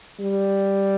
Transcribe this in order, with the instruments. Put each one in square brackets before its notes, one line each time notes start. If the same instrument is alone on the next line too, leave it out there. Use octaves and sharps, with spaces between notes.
[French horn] G3